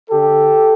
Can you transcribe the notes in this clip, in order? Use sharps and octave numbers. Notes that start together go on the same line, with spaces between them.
D3 G4 A4